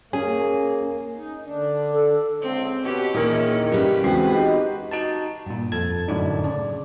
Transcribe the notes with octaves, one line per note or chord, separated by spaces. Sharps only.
A#3 C#4 G#4 G#5
D#4
D3 D4
A4
C#2 C4
B2 C#4 G4 B4
D#2 A#2 D#3 E3 C#4 E4 G#4 A#4
C#3 G3 G4 B4
E2 G#3 C4 F#4 C7
D#4 G4
D#4 F#4 A5
G2 A#2
F2 F3 A4 A5 G#6
F#2 A2 D3 D4 D#4
C#3 D5